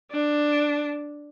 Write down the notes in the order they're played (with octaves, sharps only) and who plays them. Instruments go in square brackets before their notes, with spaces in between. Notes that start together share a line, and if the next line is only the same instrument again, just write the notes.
[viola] D4